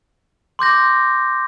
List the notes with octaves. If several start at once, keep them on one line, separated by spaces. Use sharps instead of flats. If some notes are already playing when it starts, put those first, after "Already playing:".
C6 D6 G6 A#6